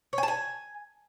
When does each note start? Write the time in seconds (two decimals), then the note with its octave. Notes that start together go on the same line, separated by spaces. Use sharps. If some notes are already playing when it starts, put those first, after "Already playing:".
0.13 C#5
0.18 G#5
0.23 A5
0.28 G#5